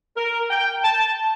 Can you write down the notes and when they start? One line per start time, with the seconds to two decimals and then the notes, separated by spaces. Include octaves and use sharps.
0.17 A#4
0.51 G5
0.84 A5